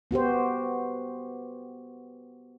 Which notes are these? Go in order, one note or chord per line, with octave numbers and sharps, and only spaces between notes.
B3 F#4 G4 C5